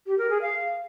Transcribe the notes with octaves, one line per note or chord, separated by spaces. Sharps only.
G4
A#4
G#4
F5